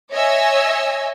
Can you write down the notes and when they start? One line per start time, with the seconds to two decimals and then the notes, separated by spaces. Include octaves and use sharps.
0.11 C#5 D#5 E5 G#5 E6